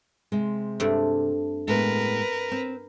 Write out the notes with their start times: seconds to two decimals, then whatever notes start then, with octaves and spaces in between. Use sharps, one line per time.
0.32 C3 G#3
0.80 G2 A3 C4
1.68 A2 G#3 B3 A#4 B4
2.52 C4